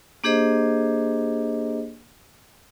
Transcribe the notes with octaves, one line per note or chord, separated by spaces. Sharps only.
A#3 D4 G4 G#4 C5 D#5